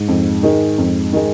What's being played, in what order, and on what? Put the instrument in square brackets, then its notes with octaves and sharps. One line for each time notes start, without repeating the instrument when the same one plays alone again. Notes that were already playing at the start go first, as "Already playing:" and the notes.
Already playing: [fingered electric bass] G#2
[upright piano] F2
D#3 G#3
F2
D#3 G#3